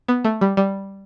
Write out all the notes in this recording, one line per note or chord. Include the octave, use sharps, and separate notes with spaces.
B3
A3
G3
G3